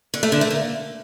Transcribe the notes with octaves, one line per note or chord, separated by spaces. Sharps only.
D3
A3
D3
A3
A#3